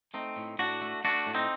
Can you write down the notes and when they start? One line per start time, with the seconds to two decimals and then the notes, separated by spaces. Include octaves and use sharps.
0.14 A3 C4 D#4
0.36 A2
0.59 A2 D4 F#4
0.81 A3
1.04 A3 D4 F#4
1.27 A2
1.34 C4 D#4